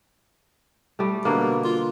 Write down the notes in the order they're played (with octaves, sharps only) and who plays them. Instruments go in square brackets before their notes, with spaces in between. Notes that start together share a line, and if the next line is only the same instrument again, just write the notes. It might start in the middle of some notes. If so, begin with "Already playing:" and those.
[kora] G3 A3
[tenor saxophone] B2 [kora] D3 A#3
[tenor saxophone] F4